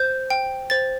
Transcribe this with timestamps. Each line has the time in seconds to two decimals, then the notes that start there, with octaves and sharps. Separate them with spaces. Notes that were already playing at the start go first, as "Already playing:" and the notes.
Already playing: C5 G6
0.30 G5
0.70 C5 A6